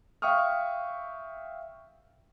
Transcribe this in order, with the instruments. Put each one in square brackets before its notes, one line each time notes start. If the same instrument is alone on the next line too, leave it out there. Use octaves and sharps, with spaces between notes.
[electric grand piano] E5 F5 G5 C#6 D#6 F6